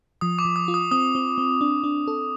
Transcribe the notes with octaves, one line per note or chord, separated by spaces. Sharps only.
F3 D#6
D6
F3
D#6
F4
D#6
C4 D#6
C4
C4
D4
D4
A4